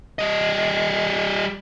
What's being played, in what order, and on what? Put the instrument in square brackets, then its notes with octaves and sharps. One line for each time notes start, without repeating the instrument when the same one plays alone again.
[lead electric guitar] G3 D#5